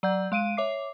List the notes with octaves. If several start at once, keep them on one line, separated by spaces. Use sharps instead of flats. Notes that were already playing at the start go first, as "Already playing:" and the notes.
F#3 D5 F#5 G6
G#3 F5 D7 D#7
C#5 E5 D6 C7